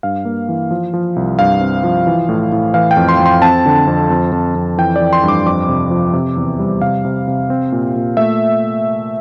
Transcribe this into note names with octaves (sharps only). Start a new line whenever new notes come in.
G2 F5
A#3
E3
F3
F3
C2
G2 F5
C4
F3
E3
A2
A2
E3 F5
G5
F2
C6
F2
C6
C4 A5
D3
F2
F2
F2
F2
E3 G5
E3 D5
C6
G2
D6
F2 D6
C3
F3
C3
E2
G3
C3 F5
C3
C3
C4
A#2
A#2
A3 E5